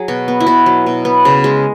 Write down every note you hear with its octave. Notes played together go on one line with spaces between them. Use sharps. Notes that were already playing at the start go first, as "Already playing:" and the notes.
Already playing: F#3 G#4
B2 F#4
B3
E4
B2 F#4
F#3
B2
B3
C#3
G#3